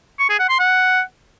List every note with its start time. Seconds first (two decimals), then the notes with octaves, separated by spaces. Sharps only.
0.19 C#6
0.29 G#4
0.39 F#5
0.49 C6
0.59 F#5